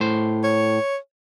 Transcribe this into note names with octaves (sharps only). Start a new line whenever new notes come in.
A2 C5
C#5